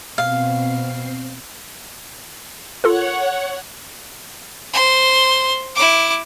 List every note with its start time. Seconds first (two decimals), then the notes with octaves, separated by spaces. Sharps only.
0.18 B2 C4 F5 C7
2.84 F4 A4 A#4 C#5 F#5
4.73 C5 C6
5.76 E4 D6